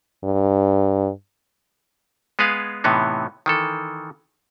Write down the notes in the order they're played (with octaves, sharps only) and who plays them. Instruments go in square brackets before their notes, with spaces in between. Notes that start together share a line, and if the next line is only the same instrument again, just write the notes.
[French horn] G2
[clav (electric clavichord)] G#3 B3 G#4 B4 F5
A2 C3 E3 B3 D#4
D#3 E3 A4